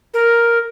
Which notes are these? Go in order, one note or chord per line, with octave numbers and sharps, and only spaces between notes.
A#4